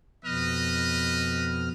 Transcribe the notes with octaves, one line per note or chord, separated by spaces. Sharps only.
F2 B2 B4 D#5 F6